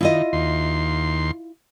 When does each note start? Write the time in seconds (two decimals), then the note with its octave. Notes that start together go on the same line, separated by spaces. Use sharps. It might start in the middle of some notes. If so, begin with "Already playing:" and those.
0.01 D#3 E4 F4 D#5
0.33 D#2 C6